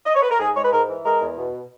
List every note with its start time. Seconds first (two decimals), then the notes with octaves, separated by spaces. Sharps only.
0.06 D#5
0.15 C#5
0.22 B4
0.31 A#4
0.40 G#2 G#4
0.56 G#3 C#5
0.65 B4
0.72 G#2 A#4
0.88 E3
1.05 G#3 A#4
1.21 E2
1.38 B2